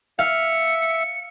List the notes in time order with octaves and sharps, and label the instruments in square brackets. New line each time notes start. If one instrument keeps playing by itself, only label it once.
[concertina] E5 [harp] F5 [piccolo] C#7